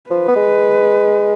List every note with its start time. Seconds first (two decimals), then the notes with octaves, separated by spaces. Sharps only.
0.10 F3 B4
0.28 B3
0.36 G#3